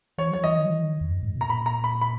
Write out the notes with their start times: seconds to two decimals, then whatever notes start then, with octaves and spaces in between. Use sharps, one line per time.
0.18 E3 C#5
0.31 F#3 C#5
0.44 E3 D#5
0.58 D#3
0.65 F#3
0.70 E3
0.83 D#3
1.01 E2
1.10 F#2
1.23 G#2
1.36 B2
1.41 A#5
1.49 A#2 B5
1.66 A#5
1.84 B5
2.01 B5